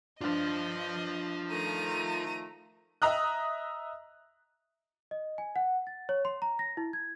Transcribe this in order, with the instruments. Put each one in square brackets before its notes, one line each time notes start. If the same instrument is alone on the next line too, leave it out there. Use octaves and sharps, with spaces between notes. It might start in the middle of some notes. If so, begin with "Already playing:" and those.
[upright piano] G2 D4 [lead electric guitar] F4 C5 [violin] D#5
[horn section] D#3 F3 A3 [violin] A#5 D#7
[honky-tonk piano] D#5 E5 A#5 D#6 F#6
[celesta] D#5
G#5
F#5
A6
C#5
C6
A#5
A#6
E4
G#6